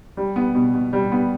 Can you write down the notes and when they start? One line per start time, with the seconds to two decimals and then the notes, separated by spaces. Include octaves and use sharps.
0.17 G3
0.36 B3
0.55 B2
0.74 B2
0.93 G3
1.12 B3